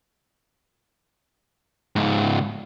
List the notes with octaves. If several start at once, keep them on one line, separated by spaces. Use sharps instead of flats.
C#2 G#2